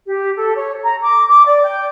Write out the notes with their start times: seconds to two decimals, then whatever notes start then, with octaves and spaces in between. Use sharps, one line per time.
0.06 G4
0.35 A4
0.55 C#5
0.82 A#5
1.01 D6
1.26 D6
1.45 D5
1.63 G5